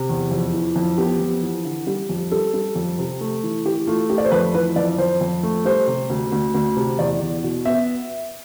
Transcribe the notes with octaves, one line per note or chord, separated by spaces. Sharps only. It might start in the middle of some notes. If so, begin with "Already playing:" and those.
Already playing: C3
E2
F2
E3
F2
B3 G4
F2
E3
D3
G3
F2
G3 A4
G3
F2
C3
A3
E3
E3 G4
A3 F4
A3 G4
D5
C5
F2 B4
E3 B4
F2 D5
F2 C5
F2
A3
G3 C5
C3
D2
D2
D2
C3
E2 D5
E2
B2
B3 E5